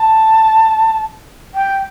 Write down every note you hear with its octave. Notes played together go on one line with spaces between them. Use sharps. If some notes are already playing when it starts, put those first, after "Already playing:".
Already playing: A5
G5